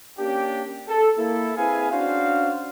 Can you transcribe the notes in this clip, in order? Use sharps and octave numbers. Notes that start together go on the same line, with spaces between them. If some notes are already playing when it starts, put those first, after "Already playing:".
A#3 C#4 D4 G4
A4
A#3 E4 A4
C4 E4 G#4 B4 F5 G#5
C#4 D4 F#4 C5 F5